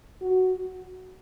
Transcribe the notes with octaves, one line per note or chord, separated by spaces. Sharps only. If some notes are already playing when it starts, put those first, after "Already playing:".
F#4